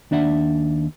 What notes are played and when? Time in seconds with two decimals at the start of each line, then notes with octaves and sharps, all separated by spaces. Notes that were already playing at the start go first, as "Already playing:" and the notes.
0.11 D#2 D4 D5 E5 F#5